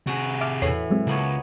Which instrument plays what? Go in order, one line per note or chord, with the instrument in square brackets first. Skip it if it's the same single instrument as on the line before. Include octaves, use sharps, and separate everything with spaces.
[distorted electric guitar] C3 G#4 [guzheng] F#4
[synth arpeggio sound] E5 D6 F6 [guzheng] A5
[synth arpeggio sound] E2 C#5 C7 [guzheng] A2 E3
[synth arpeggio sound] F#3 G#3 C4
[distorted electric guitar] C#2 [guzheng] A#3 B3 C#5